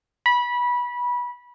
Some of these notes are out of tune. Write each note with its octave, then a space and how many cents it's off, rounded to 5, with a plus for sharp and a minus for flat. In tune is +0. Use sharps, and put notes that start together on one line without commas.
B5 -20